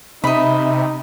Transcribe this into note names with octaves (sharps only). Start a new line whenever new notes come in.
C3 D#4 D#5 E5 B5